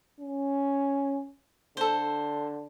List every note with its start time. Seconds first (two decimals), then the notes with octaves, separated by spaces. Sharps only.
0.20 C#4
1.77 D3 A4 C5